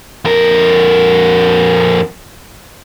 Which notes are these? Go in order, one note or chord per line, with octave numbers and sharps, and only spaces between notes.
F2 A#4